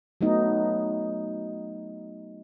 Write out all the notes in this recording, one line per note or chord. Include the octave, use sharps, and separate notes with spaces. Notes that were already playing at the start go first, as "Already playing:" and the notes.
F#3 A3 B3 D#4